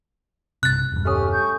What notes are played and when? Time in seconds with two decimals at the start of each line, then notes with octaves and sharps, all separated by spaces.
0.63 B1 G2 C3 F#6 A6
0.92 E1 G2
1.05 A3 C#4 G4 D#6 F6
1.31 C#6 G6